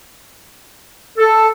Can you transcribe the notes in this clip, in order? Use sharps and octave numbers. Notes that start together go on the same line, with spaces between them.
A4